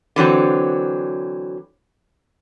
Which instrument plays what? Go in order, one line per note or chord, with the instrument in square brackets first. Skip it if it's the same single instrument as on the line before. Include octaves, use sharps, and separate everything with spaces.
[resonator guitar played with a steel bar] D3 E3 F#3 C4